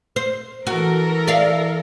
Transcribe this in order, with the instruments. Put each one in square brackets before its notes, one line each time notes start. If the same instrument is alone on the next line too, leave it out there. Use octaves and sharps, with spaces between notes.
[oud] C5
[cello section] E3 A4 A#4 [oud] F#4
[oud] D5 E5 F5